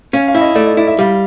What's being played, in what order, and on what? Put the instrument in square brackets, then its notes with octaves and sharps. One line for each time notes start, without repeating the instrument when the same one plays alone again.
[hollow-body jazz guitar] C#4 [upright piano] F5
[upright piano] F5
[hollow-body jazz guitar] E4
[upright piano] D#5
[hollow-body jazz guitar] A3 [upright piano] D5
[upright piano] D#5
[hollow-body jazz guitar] E4 [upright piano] D5
[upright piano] E5
[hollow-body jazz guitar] G3 [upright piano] F5